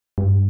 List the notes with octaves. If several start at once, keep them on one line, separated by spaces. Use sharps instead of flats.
G2